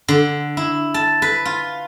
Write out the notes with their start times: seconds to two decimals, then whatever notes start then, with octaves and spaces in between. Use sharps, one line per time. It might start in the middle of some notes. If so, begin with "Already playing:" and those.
0.08 D3
0.57 E4
0.94 A5
1.22 B4
1.45 F4